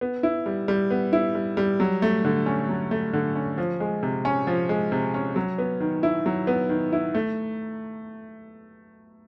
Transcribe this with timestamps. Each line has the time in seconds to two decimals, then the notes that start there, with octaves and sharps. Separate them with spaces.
0.01 B3
0.23 E4
0.46 G3
0.68 G3
0.91 B3
1.13 E4
1.35 G3
1.57 G3
1.80 F#3
2.02 A3
2.25 D3
2.46 C#4
2.69 F#3
2.91 A3
3.13 D3
3.35 C#4
3.58 F3
3.80 G#3
4.03 C3
4.25 C#4
4.47 F3
4.69 G#3
4.92 C3
5.14 C#4
5.36 F#3
5.58 B3
5.80 D#3
6.03 E4
6.26 F#3
6.47 B3
6.69 D#3
6.92 E4
7.15 A3